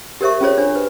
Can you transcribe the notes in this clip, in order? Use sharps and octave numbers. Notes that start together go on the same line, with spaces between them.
G4 A#4 C5 E5 C#6
C#4 F4 G#4 C5 C#5
D4 C5
B4